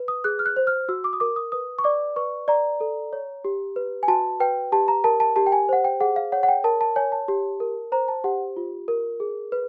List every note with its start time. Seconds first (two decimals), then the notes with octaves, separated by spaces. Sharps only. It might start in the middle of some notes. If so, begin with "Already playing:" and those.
Already playing: B4
0.08 D#6
0.24 G#4 F#6
0.39 F6
0.46 F#6
0.56 C5
0.67 F6
0.89 F#4 E6
1.04 D6
1.13 D#6
1.20 A#4 D6
1.36 D#6
1.52 B4 D#6
1.79 C#6
1.84 D5 D6
2.16 B4 C#6
2.48 D5 A#5
2.80 A4
3.13 C#5
3.44 G4
3.76 B4
4.03 G#5
4.08 F#4 A5
4.40 B4 G5
4.72 G4 A5
4.88 A#5
5.04 A#4 A5
5.20 A5
5.36 G4 A5
5.46 G5
5.52 G#5
5.69 C5 F#5
5.85 G5
6.00 G#4 F#5
6.16 F5
6.32 C#5 F#5
6.43 F#5
6.48 G5
6.64 A#4 A5
6.81 A5
6.96 C#5 G#5
7.12 A5
7.28 G4
7.60 A#4
7.92 C5 A#5
8.08 A5
8.24 G4 F#5
8.56 F4
8.88 A#4
9.20 G#4
9.52 B4